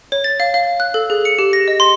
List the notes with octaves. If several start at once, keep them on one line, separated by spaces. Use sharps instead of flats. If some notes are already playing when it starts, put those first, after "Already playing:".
C#5
A6
F5
F5
F#6
A4
G#4
C#7
G4
A#6
D#5
C6